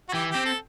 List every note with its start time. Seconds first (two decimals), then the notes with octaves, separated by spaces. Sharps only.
0.09 F#4
0.14 E3 G4
0.30 C4 G4
0.46 A4